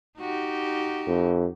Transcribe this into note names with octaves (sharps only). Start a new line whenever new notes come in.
D#4 F#4 G4
F2